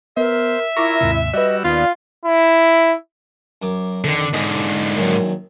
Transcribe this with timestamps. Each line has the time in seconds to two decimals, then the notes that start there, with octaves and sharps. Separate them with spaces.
0.17 B3 A#4 C5 E5
0.77 E4 F4 A#4 A#5 C#6 D6 A#6
1.01 D#2 G#2 C3
1.33 G3 F#4 B4 D5 D#5 E6
1.64 D#2 B3 F4 F5
2.25 E4
3.62 F#2 A#4 D6
4.04 F2 D3 D#3
4.34 G#2 D3 G#3 B5 D#6
4.97 A#1 F#2 D#3